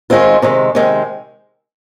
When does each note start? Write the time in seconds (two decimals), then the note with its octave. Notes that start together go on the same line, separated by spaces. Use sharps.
0.10 D#3 G#3 C4 F4
0.42 C3 D#3 G#3
0.75 C3 D#3 G#3